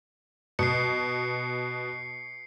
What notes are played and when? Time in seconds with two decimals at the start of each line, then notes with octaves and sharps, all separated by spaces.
0.59 B2 C7 C#7